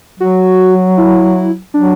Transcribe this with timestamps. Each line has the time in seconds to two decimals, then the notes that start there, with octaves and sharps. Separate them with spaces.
0.20 F#3 F#4
0.97 E4
1.74 F#3 D4